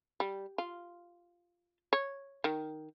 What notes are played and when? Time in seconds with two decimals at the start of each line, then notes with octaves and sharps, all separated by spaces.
0.20 G3
0.58 F4
1.93 C#5
2.44 D#3